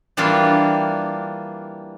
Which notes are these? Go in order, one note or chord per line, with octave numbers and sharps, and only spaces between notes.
E3 G3 A#3 D4 F4